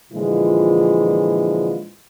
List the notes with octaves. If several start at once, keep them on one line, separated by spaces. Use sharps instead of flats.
A#2 D3 E3 F3 G#3 F4